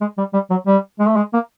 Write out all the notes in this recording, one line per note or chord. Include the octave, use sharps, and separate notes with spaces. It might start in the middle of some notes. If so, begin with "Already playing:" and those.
G#3
G3
G3
F#3
G3
G#3
A3
G#3
A#3